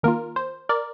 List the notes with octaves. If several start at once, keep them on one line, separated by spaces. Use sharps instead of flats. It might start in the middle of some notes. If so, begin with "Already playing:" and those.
D#3 A#3 F4 A#4
C5
A#4 D5